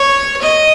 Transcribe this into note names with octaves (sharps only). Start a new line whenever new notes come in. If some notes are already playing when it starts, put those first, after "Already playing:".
Already playing: C#5
D#5